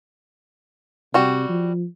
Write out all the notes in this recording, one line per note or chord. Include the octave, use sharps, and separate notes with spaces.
C3 G3 F#4
F3